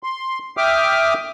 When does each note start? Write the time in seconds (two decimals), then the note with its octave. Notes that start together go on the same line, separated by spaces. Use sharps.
0.03 C6
0.57 E5 G5 D6 D#6 F6